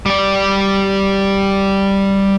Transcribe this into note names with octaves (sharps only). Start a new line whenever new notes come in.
G3 D5